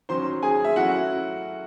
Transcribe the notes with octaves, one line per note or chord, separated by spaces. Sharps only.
D#3 F#3 C#4 C5 C6
G#4 G#5
E5
F#3 A3 C#4 E4 F#4 F#5